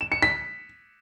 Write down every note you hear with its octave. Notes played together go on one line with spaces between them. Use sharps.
E7
C#7
B6